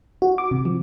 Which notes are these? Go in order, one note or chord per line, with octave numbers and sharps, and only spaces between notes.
F#4
D6
C3
F3